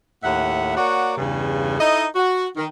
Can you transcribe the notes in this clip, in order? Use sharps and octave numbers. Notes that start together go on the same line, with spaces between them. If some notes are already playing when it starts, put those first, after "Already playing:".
D#2 A2 E5 F#5
A#3 F#4 C#5 D5 F#5
E2 G2 C#3
D#4 E4 A4 D#5
F#4
D#3